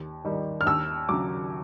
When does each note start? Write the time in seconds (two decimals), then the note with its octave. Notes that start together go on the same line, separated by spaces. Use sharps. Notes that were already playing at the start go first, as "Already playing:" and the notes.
Already playing: D#2
0.25 D#3 G3
0.61 F6
0.66 D#2 E6
1.09 C#3 F#3 D6